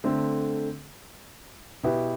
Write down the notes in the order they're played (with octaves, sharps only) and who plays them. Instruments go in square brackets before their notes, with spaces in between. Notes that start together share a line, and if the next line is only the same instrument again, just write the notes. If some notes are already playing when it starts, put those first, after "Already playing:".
[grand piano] D3 A3 C4
B2 B3 E4 G4 B4